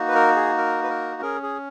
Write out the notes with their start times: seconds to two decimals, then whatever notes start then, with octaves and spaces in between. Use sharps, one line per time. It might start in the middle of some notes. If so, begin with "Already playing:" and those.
Already playing: A#3 D#4 F#4
0.08 B4
0.15 A#4
0.36 G#4
0.58 A#4
0.83 B4
0.90 A#4
1.22 C#4 G#4 A#4
1.43 G#4